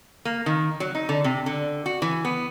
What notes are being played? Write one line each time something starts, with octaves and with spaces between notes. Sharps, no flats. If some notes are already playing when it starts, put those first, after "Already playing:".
A#3
D#3
F#3
D#4
D3
C3
D3
F#4
E3
B3